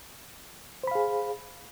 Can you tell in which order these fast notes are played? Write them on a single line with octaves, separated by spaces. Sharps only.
C5 B5 F5 G#4